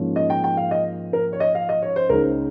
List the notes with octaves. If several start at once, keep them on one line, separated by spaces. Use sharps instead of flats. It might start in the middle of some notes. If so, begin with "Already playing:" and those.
Already playing: G#2 F3 A#3 C#4
D#5
G5
G5
F5
D#5
A#4
C#5
D#5
F5
D#5
C#5
C5
C#2 C#3 G#3 D#4 A#4